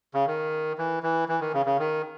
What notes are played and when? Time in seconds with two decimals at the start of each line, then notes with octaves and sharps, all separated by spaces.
0.14 C#3
0.27 D#3
0.78 E3
1.03 E3
1.29 E3
1.41 D#3
1.54 C#3
1.66 C#3
1.79 D#3